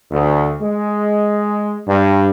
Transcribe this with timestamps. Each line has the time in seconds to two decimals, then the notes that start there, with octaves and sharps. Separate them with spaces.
0.11 D2
0.61 G#3
1.87 G2